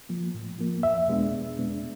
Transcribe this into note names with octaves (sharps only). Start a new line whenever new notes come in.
F3 A#3
A2
F3 A#3
E2 E5
B2 G#3 B3 D4
E2
B2 G#3 B3 D4